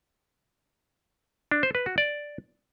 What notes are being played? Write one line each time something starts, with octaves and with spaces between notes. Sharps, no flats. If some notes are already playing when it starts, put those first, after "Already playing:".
D4
C5
B4
F#4
D5